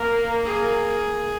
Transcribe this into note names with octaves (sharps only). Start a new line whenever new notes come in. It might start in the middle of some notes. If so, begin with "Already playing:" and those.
Already playing: A#3 A#4
G#4